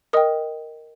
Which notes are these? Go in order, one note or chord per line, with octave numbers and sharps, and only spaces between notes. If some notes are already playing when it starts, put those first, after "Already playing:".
A#4 D#5 G5 D#6